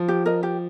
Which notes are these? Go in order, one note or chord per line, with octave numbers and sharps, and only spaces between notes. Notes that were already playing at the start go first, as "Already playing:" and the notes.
Already playing: F3
G4
A#4 D#5
G4